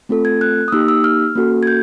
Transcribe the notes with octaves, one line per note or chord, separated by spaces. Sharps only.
A3 C4 F4 A4
G#6
F#6
D#6
A#3 D#4 G4 E6
E6
F6
A#3 C#4 F#4 A4
G#6
G6